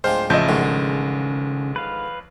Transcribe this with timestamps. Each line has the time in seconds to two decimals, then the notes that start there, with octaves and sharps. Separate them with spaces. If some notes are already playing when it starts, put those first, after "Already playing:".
0.04 D1 G#3 D4 F4 C5 G5 F6
0.30 A1 C#3 F3 D#5 E5 A5 G6
0.48 G#2 D#3 F#3 G#3 A3
0.61 D3
1.76 B4 F5